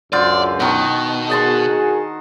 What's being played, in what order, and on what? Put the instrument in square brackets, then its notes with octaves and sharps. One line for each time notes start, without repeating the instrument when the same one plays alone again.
[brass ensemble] C#2 F#2 [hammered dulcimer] D3 F4 C5 [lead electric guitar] D5
[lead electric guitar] B2 [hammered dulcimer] D#3 F#4
[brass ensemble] F#4 G#4 A#4 [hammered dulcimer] D#5 A5 C6